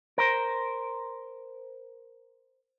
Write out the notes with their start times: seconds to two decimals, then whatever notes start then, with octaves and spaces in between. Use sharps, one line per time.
0.18 A#4 C5